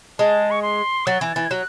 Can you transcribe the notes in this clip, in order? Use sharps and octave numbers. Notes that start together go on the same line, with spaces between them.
G#3 A5
C#6
C6
F#3 A6
E3 G#6
E3 A6
G#6
F#3 F#6